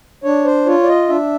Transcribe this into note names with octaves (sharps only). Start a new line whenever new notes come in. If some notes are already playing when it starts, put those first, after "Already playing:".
D4 C#5
C5
F4 C#5
D5
D#5
D4 E5